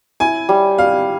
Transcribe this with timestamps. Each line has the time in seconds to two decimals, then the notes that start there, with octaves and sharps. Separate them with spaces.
0.20 E4 G#5
0.49 G3
0.78 G3 F5